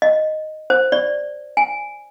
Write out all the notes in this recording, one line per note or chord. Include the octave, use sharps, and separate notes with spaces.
D#5
C5
D5
G#5